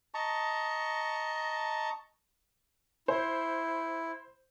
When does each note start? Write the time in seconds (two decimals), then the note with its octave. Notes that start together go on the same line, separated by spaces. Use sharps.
0.14 D#5 A5 A#5 C#6
3.08 E4 C5